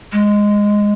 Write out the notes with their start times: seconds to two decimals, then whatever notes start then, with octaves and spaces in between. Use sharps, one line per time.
0.13 G#3